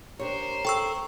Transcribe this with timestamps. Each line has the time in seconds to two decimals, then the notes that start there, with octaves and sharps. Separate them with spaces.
0.19 D4 G4 A#4 C5 C#5
0.65 A4 G5 C#6 E6